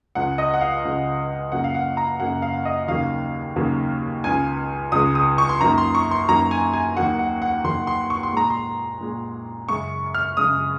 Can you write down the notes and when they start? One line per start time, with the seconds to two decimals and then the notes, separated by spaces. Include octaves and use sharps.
0.15 C#2 C#3 G#3 F#5
0.38 D#5
0.54 F#5
0.61 F5
0.84 C#2 C#3 G#3
1.52 F#2 C#3 F#3 A#3 F#5
1.64 F5
1.75 F#5
1.97 A#5
2.20 F#2 C#3 F#3 A#3 F#5
2.42 F5
2.65 D#5
2.88 D#2 C#3 F#3 A#3 F5
3.56 D#2 C#3 F#3 A#3
4.24 C#2 C#3 G#3 G#5
4.92 C#2 C#3 G#3 D#6
5.15 D#6
5.38 C#6
5.49 C6
5.60 F#2 D#3 F#3 A#3 A#5
5.78 C6
5.95 C#6
6.11 C6
6.28 F#2 D#3 F#3 A#3 A#5
6.51 G#5
6.73 G#5
6.97 D#2 D#3 F#3 A#3 F#5
7.19 F#5
7.42 F#5
7.64 D#2 D#3 F#3 A#3 C6
7.87 C6
8.10 C#6
8.23 C6
8.33 A#2 G#3 A#5
8.50 C6
9.01 A#2 G#3
9.69 F#2 C#3 G#3 C#6
10.14 F6
10.37 F#2 C#3 G#3 D#6